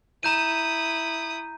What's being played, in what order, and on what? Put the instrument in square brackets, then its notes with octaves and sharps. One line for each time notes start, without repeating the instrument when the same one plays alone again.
[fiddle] E4 D#6 [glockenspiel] A#5 G6 D#7